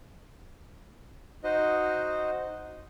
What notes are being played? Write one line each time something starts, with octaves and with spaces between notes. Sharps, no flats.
D#4 F#4 C5 D#5